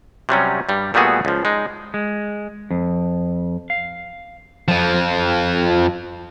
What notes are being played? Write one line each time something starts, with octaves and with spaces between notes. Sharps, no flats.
C3 F#3 G3 C#4
G2 G3
A#2 G3 A3 B3 F#4 G#4
C#2 F3
G#3 D#4
G#3
F2
F5
F2 F3